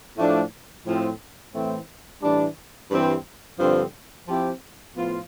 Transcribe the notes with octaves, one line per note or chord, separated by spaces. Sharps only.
A2 F3 A3 D4
A2 F3 C4
A2 E3 A3 C4
A2 E3 G3 D4
G2 E3 G3 C4
G2 D3 F3 C4
F3 C4 E4 G4
A2 F3 B3 F4